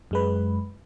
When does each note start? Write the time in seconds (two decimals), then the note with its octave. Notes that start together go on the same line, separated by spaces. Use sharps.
0.11 F#2 G#3 B4